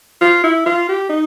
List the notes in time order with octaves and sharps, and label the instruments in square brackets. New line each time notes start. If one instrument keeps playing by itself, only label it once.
[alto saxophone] F4
E4
F4
G4
D#4